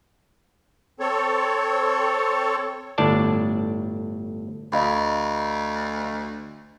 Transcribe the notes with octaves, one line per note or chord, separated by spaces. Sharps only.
C4 A4 C#5
G1 A2 D4 D5 A5
D2 D#5 F5 B5